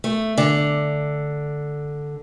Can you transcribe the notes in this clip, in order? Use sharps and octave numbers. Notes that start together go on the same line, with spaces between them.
A3
D3